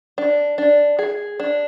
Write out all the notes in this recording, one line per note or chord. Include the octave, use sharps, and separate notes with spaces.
D4
D4
G#4
D4